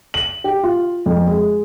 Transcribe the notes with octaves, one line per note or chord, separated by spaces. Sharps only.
F#7
G4
F4
F2
G#3